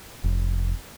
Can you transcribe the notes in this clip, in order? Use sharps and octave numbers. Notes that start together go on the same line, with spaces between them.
F1